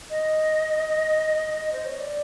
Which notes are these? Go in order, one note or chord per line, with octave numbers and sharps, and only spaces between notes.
D#5
C5
C#5
D5